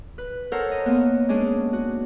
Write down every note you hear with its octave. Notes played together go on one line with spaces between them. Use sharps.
B4
A4 A#4 C5 C#5 F#5
D#5
A#3 B3
G#3 C#4 D4 G#4
F#4